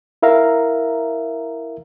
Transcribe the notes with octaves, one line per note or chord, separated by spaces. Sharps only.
E4 A#4 E5 F5 A#5